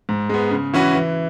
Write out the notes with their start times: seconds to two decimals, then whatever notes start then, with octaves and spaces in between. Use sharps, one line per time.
0.09 G#2
0.29 G#3 B3
0.51 C#3
0.74 E3 C#4 F#4 B4
0.95 E3